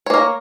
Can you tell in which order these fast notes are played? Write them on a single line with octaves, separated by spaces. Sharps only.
C#5 A#3 A#4